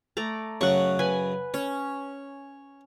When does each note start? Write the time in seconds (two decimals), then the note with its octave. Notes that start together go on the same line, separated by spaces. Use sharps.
0.17 A3 D5 A#5
0.61 F#2 C#3 F#5 C#6
0.99 B4 G#5
1.54 C#4 C#5